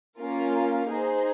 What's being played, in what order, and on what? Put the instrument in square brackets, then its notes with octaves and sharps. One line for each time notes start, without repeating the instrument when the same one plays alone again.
[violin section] A#3 C#4 F4 A#4
D#4 G#4 C5